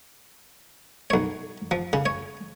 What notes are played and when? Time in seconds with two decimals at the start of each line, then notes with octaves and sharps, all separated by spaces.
1.10 B1 C#5
1.71 F3
1.93 C#3
2.06 C#5